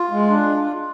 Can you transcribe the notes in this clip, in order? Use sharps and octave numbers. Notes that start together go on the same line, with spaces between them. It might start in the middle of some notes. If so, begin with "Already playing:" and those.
Already playing: F4
G#3
D4